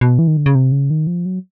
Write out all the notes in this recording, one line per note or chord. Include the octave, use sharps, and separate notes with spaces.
B2
E3
D#3
D3
C#3
C3
C#3
D#3
F3
F#3